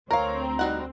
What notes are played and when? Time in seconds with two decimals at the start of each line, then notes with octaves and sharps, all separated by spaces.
0.11 D2 C4 A#4 C#5 F5 A#5
0.59 G3 D#4 F#4 F#5